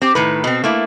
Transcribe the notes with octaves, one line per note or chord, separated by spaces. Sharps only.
C4 G4
A2 D#3 B4
B2 C4
A3 A#3 E4